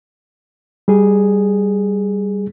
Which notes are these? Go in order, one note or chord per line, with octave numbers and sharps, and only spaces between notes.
G3 G#4